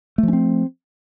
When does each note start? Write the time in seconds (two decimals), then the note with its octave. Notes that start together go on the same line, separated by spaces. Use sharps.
0.18 A3
0.23 F3
0.28 C#4
0.33 C4